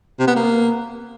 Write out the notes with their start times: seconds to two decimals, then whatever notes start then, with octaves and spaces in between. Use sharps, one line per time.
0.19 C3
0.28 B3
0.36 A#3